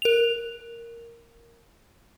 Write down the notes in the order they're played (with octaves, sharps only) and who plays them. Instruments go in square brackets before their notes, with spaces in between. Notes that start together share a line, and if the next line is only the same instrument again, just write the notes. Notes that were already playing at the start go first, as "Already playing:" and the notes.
[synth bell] A#4 F7